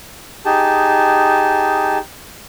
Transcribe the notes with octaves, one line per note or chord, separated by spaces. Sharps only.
D#4 G4 G#4 A5